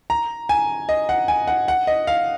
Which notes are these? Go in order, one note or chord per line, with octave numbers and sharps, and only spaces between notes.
A#5
G#5
D#5
F#5
G#5
F#5
F#5
D#5
F5